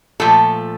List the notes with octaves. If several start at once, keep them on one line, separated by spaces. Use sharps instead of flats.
A#2 F3 A3 A4